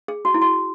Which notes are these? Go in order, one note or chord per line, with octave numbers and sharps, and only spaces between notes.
G#4
F#4
E4
F#4